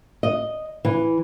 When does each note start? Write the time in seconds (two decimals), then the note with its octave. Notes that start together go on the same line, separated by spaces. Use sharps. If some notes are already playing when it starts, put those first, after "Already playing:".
0.23 D#5
0.85 E3